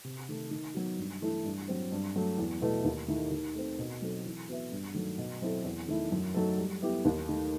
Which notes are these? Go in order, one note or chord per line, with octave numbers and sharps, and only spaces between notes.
C3
D#3 A3
D#3
F#3 B3 F#4
G2
E3 A3 E4
G2
F#3 C4
G2
F#3 A3
E2
B2 A3 E4 B4
D#2
D#3 A3 E4
D#3
A3 C4
B2
F#3 C4 D#4 A4
E3
B3 F#4 B4 E5
G2
D#3 F#3 A3
B2
F#3 C4 E4 A4
E2
D#3 A3 E4
F#2
F#3 A3 D#4 A4
G3
B3 E4 G4
D#2
D#3 A3